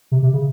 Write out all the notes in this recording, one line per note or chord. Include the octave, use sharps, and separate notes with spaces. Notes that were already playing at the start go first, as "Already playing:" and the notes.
C3
C3
C#3